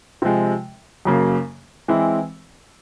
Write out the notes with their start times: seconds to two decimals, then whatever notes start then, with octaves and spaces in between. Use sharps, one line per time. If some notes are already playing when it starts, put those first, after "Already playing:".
0.22 C3 F3 G#3
1.05 F#2 C#3 F#3 A#3
1.88 E3 G#3 C4 E4